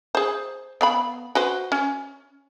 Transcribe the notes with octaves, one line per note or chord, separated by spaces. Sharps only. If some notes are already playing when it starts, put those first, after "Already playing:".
G#4 C5
B3 F5 B5
F#4 B4 C5
C#4